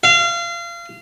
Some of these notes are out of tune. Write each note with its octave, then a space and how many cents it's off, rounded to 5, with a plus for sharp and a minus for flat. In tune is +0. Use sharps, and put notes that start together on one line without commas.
F5 -30